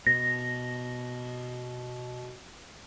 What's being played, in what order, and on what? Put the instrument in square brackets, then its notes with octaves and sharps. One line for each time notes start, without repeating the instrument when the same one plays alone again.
[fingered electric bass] B2 [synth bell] A#6